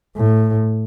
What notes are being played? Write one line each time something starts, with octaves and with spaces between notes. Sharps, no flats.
A2